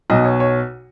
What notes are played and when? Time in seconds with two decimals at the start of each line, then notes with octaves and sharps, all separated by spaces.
0.10 B1 B2 F#3 D#5
0.25 C#5
0.40 C#5